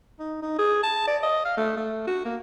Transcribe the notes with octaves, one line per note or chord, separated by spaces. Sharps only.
D#4
D#4
G#4
A5
D5
D#5
F5
A3
A3
F#4
A#3